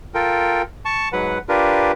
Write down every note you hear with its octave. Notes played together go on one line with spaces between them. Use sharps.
F4 A4 A#4 G5
A5 C#6
G#2 F#3 B4 F#5
D4 F4 G4 A#4 B4